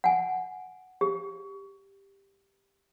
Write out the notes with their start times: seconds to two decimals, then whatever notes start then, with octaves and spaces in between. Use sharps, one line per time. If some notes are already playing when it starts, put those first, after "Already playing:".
0.04 F#5 G#5
1.01 G4